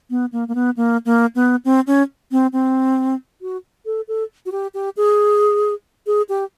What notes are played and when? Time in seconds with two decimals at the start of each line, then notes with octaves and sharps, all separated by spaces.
0.10 B3
0.32 A#3
0.48 A#3
0.55 B3
0.77 A#3
1.05 A#3
1.35 B3
1.65 C4
1.87 C#4
2.32 C4
2.53 C4
3.41 F#4
3.86 A4
4.08 A4
4.46 F#4
4.52 G4
4.74 G4
4.97 G#4
6.07 G#4
6.29 G4